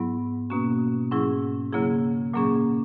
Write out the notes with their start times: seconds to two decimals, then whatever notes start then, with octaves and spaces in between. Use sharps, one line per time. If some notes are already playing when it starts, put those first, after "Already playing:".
Already playing: G#2 F#3 B3 E4
0.50 B2 A#3 C#4 F#4
1.11 G#2 F#3 C#4 E4 G#4
1.73 C#3 F#3 A#3 E4 G#4
2.33 A#2 F#3 A#3 C#4 G#4